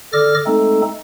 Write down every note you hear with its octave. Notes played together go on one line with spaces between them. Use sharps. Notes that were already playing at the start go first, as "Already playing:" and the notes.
D3 A4 D5 D6 F6 A#6
G#3 A3 C4 D#4 A4